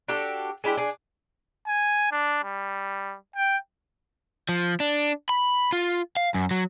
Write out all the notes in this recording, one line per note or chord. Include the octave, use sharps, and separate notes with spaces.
D4 F#4 G4 A4
G#3 D4 E4 G4
D4 G#4
G#5
D4
G3
G5
F3
D4
B5
F4
F5
F#2
F#3